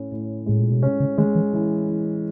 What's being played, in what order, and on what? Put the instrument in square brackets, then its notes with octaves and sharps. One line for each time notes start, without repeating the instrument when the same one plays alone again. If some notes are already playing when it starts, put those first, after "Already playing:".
Already playing: [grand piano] A2 C#4
A2
[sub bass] A2 [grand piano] G#3
[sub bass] A#2
B2
[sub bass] C3 [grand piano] C#4
[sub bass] C#3
[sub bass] D#3 [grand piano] G#3
[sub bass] E3
[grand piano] E3
E3